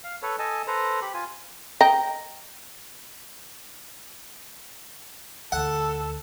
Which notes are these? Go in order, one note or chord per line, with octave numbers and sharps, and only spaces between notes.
F5
A4 B4 C#5
A4 D#5 G#5 A5
A4 B4 C5 A#5
G4 B5
F4 G#5
D#5 G5 A#5
D2 A4 F#5